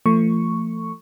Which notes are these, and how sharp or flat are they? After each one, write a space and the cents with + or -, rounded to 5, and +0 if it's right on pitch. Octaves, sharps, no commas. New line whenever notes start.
F3 -35 A3 +25 C#6 +0